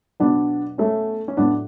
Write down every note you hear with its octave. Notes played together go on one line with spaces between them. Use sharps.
B2 F#3 B3 D4
A3 C#4
C#4
A2 F#3 B3 D4